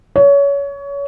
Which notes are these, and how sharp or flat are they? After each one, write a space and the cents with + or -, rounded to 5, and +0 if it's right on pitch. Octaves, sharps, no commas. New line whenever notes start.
C#5 +25